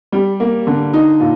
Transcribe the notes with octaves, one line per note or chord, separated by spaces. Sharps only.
G3
A#3
D3
D#4
A#2